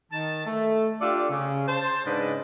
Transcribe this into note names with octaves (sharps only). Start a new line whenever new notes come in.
D#3 A5
A3
D4 F4 G4 A4 D5
C#3
C5 A5
G#2 C#3 D4 G#4 B4 D#5